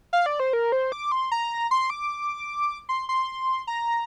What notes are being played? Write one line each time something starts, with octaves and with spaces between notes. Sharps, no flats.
F5
D5
C5
A#4
C5
D6
C6
A#5
C6
D6
C6
C6
A#5